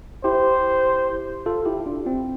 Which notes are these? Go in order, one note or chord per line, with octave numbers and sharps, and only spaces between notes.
E4 G4 C5
F4 A4
E4 G4
E4
D4 F4
C4 E4